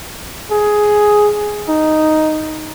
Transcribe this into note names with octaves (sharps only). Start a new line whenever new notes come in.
G#4
D#4